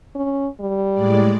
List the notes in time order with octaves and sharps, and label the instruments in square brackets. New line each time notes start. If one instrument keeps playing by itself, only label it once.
[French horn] C#4
G3
[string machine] A2 G#3 D5